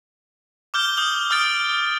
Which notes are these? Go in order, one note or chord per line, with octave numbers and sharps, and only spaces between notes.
D6 F6 G6 G7
D#6 G6 F#7
D#6 F6 G6 A6 D7